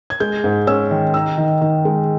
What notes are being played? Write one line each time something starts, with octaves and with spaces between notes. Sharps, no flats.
G#6
G#3 G6
G#2
C#4 E6
D#3
D#4 E6
D#3
D#3
G#3